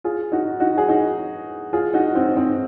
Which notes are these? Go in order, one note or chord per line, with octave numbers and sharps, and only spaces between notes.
F4 G#4
D#4 F#4
D#4 F#4
G#4
D#4 F#4
F4 G#4
D#4 F#4
C4 D#4
C4 D#4